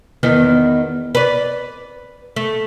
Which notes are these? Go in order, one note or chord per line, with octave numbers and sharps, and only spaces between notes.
E2 D#3 B3
B4 D5
A3